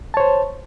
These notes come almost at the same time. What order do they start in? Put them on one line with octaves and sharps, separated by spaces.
A5 C#5 C5